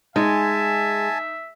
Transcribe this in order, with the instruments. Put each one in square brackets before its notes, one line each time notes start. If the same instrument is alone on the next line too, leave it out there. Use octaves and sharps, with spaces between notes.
[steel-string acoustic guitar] G#3 [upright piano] D#4 [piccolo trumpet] E5 [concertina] G#5 A5